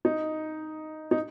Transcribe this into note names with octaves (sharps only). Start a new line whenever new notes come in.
D#4
D#4